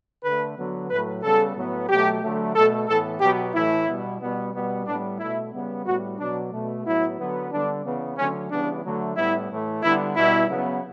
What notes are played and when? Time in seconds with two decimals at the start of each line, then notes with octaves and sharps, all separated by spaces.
0.23 D3 A3 B4
0.57 D3 F#3 B3
0.90 A2 F#3 A3 B4
1.23 C#3 G3 B3 A4
1.55 A2 F#3 B3
1.89 B2 F#3 A3 G4
2.22 D3 F#3 A3
2.55 B2 A3 A4
2.88 A2 E3 B3 A4
3.21 B2 F#3 B3 G4
3.54 A2 E3 A3 E4
3.87 B2 G3 B3
4.20 B2 G3 B3
4.53 B2 G3 B3
4.86 A2 G3 B3 D4
5.19 B2 A3 E4
5.53 C#3 G3 B3
5.86 A2 G3 B3 F#4
6.19 B2 F#3 B3 D4
6.52 B2 A3
6.84 A2 F#3 B3 E4
7.18 D3 F#3 B3
7.51 D3 G3 B3 D4
7.84 C#3 E3 B3
8.17 D3 F#3 A3 C#4
8.50 C#3 E3 G3 B3 D4
8.83 D3 F#3 A3
9.16 A2 G3 B3 E4
9.49 A2 E3 A3
9.82 D3 G3 B3 E4
10.15 B2 G3 B3 E4
10.48 C#3 F#3 B3